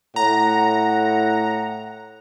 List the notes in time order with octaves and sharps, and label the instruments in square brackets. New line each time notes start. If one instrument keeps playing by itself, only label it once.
[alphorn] A2 [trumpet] F#5 [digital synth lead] A#5